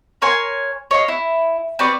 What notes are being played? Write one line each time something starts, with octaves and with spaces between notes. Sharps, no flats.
A#4 C#5 G#5 C6
C#5 D#5 F5
E4
C4 B4 D5 C#6